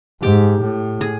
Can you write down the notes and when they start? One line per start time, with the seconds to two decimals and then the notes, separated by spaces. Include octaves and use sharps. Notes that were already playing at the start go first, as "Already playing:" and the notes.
0.22 G#2 G4
0.62 A2
1.01 G#4